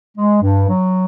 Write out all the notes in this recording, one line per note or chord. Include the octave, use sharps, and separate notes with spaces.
G#3
G2
F#3